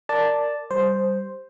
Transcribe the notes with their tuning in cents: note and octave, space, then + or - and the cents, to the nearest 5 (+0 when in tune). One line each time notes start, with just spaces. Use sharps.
A#4 -15 D5 +0 A5 +0
G3 -5 C5 +0